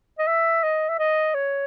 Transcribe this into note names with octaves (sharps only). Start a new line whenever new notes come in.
D#5
E5
D#5
E5
D#5
C#5